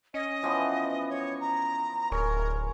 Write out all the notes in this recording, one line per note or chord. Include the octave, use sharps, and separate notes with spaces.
C#4 D#5
E3 F3 B3
C#5
A#5
D1 G#4 A#4 C#5